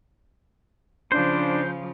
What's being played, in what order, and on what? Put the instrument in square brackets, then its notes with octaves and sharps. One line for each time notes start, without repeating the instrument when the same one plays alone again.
[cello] C#3 F3 [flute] D4 [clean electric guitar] C5